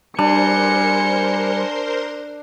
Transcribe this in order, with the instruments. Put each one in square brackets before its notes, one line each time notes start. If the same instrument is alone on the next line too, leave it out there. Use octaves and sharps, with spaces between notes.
[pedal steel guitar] G3 [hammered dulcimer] D4 [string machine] A#4 C5 C6 [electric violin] G#5 C#7